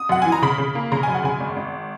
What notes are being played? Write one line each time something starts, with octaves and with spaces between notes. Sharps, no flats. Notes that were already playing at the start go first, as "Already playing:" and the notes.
Already playing: D#6
F#2 F#5
E3 G#5
A#5
C#3 B5
C#3
A#3
C#3 A#5
F#2 G#5
F#5
C#3 G#5
G#1
G#1